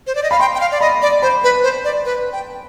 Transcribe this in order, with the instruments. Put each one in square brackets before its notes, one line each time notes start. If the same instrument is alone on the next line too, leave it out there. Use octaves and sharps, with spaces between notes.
[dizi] C5
D5
D#5
[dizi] F5 [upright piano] B5
[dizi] G5 [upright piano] C6
[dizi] G5
F5
D5
[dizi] D#5 [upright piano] B5
[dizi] D5
[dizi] C5 [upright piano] B5
[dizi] B4
C5
D5
B4
G5